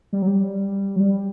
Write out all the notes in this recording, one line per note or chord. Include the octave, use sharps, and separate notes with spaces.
G3
F#3
G3
F#3
G3